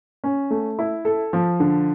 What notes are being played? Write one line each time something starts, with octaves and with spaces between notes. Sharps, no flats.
C#4
A3
E4
A4
F3
D3